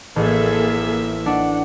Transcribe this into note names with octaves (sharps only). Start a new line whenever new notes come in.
A1 F3 A#3 G#4 A4 E5
D4 F#5